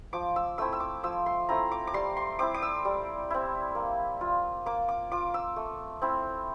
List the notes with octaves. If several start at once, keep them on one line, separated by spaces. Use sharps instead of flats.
F3 D6
E6
A3 C4 E4 E6
E6
D6
F3 E6
C6
A3 C4 E4 A#5
D6
D6
G3 C6
C6
C4 E4 D6
D6
E6
G3
C4 E4
A#3
F4
A#3 D6
D6
F4 D6
E6
A3
C4 E4